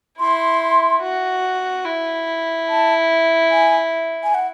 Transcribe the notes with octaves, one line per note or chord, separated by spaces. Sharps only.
E4 C6
F#4
E4
A5
G#5
G#5
F#5